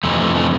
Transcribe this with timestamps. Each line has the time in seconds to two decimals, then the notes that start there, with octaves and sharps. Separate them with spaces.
0.04 F2 C3 E3 A3
0.20 A3
0.35 A3